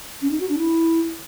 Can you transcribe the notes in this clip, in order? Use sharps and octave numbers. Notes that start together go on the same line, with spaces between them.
C#4
D#4
F#4
D4
E4